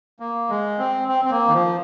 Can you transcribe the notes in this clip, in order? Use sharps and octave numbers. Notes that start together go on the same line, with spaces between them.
A#3
G#3
C4
C4
C4
A#3
D#3
F3